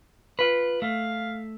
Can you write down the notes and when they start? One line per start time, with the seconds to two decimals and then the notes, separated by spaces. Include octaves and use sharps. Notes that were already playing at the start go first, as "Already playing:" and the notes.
0.39 F4 B4
0.82 A3 F5